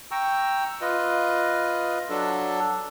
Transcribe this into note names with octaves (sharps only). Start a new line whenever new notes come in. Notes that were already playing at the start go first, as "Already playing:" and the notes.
G5 A#5 C#6 E6
F4 B4 D#5
F#3 D4 A4